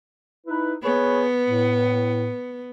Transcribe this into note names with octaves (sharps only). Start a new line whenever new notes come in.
D#4 E4 B4
B3 G#4 B4 C#5
A2